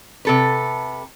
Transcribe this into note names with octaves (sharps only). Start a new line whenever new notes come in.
C3 A4 B4